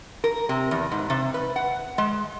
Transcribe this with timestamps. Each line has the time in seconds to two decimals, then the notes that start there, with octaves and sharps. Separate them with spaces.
0.24 A#4
0.49 C3
0.71 E2
0.92 G#2
1.10 C3
1.34 B4
1.56 F#5
1.98 G#3